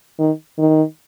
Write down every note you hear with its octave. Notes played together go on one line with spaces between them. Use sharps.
D#3
D#3